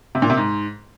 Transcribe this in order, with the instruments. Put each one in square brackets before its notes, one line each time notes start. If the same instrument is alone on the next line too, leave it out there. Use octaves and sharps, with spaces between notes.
[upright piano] C3
A#2
C3
G#2